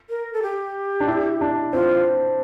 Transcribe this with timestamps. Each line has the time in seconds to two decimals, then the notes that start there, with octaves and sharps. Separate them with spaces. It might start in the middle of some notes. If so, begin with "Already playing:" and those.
0.10 A#4
0.33 A4
0.42 G4
1.00 D4
1.08 E4
1.41 D4
1.73 C4 F4